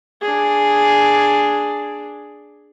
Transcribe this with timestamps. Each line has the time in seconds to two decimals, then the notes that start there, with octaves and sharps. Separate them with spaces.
0.22 D4 G#4